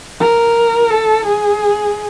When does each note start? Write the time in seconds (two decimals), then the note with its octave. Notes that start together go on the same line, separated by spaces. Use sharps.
0.21 A#4
0.91 A4
1.26 G#4